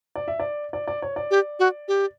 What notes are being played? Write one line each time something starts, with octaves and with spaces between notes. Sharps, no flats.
D5
E5
D5
D5
D5
C#5
D5
G4
F#4
G4